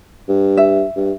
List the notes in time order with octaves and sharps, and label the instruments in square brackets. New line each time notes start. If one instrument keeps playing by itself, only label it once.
[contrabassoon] G2
[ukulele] E5
[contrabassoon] G2